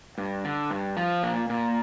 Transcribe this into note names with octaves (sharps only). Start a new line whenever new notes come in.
G2
D3
G2
F3
A#2
A#2